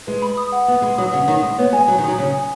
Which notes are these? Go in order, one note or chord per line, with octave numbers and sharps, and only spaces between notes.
G#3 B4
B5
D#6
F#5
B3 B4
G#3 B5
F#3 D#6
C#3 F#5
D#3 C#5
G#3 D#6
B3 C#5
G#3 G#5
F#3 C#5
D#3
F#3 D#6
C#3 C#5
G#5